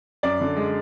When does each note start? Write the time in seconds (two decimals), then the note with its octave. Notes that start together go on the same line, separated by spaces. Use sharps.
0.23 F#2 D5
0.41 D3
0.56 G#3